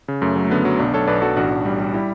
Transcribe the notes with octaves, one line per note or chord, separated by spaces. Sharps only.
C#3
F#2 A3
F#3
A3
D3 B3
F#3
B1 B3 D4
B1 A4 C#5
B1 B4 D5
B1 F#4 A4
A1 D4 F#4
A1
G3
G3
G3 E4 G4